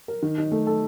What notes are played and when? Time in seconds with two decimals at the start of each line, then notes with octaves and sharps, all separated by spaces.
0.08 A#4
0.22 D#3
0.38 D#4
0.52 A3
0.67 A4